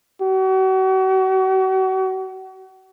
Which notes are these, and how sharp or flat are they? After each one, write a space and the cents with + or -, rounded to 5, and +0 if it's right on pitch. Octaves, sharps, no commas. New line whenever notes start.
F#4 +40